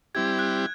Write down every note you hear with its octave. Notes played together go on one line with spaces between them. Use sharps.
G3 C4 E4 G4 G#6
F#6